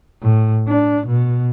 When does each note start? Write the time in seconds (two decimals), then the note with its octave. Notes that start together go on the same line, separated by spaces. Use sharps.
0.22 A2
0.68 D4
1.07 B2